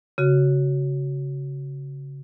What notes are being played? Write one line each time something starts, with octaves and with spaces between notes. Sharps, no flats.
C#3 F#4